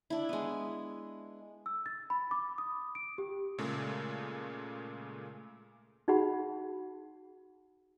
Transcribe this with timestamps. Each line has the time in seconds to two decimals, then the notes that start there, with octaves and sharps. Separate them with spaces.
0.10 D4 E4
0.29 G#3 B3
1.66 E6
1.86 A6
2.10 B5
2.31 D6
2.58 D#6
2.95 D7
3.18 G4
3.58 A#2 C#3 G#3 A3
6.08 D#4 F#4 G#4 F#5 B5